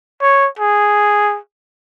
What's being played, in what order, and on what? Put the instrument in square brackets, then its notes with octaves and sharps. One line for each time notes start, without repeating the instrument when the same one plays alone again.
[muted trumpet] C#5
G#4